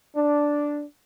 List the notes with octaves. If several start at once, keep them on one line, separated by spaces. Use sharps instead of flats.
D4